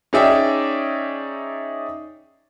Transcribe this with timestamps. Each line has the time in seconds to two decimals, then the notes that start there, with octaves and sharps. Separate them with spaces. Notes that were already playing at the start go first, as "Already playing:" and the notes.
0.13 C#4 D#4 G#4 D5 E5 G5